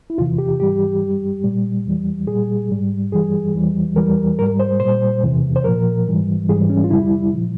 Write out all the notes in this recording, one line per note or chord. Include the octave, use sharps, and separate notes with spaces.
E4
E2 C3 E3 F4
G4
G#2 E3 G3 G4
G2 G3
A#2 G3
E2 E3 G3
A#2 G3 G#4
G#2 G3
G2 E3 G3 G#4
E2 E3 G3
E2 E3 G3 A#4
G#2 G3 A#4
C5
A#2 G3 C5
E2 C3 E3
C5
A#2 F3 A#4
G#2 E3 G3
G#2 E3 G3 G#4
C#4
F4
F2 C#3 G3 E4
A#2 F3